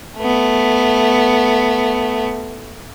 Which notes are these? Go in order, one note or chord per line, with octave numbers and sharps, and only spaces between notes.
A3 B3